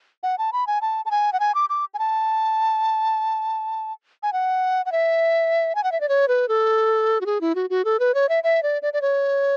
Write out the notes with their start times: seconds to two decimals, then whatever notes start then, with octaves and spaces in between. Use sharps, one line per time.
0.23 F#5
0.38 A5
0.53 B5
0.67 G#5
0.81 A5
1.06 A5
1.11 G#5
1.33 F#5
1.40 G#5
1.55 D6
1.70 D6
1.94 G#5
1.99 A5
4.23 G#5
4.33 F#5
4.86 F#5
4.92 E5
5.75 G#5
5.84 F#5
5.92 E5
6.01 D5
6.09 C#5
6.28 B4
6.48 A4
7.21 F#4
7.26 G#4
7.41 E4
7.55 F#4
7.70 F#4
7.85 A4
8.00 B4
8.14 C#5
8.29 E5
8.44 E5
8.63 D5
8.82 D5
8.93 D5
9.02 C#5